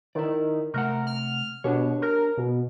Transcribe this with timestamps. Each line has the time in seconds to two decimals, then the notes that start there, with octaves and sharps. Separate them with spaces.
0.15 D#3 E4 D5
0.74 C3 A3 A#4 F#5
1.07 F6
1.64 B2 D4 G4 C#5
2.02 A#4
2.38 B2